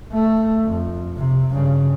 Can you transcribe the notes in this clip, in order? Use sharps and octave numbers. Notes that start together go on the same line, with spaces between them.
A3
F2
C3
G2 C#3